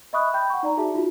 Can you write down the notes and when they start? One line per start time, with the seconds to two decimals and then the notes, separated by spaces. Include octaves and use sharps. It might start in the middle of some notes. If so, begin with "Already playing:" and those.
0.13 D#5 E5 B5 C#6 D#6 F#6
0.34 G5 B5 G6
0.50 F#5 C#6
0.63 D#4 D5 A#5
0.77 D#4 F#4 G#4 E5 A5
0.94 D#4 F4 F#4